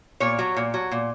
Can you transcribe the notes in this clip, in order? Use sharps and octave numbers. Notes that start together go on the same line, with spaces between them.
A#2 C#5
F#3
A#2
F#3
A#2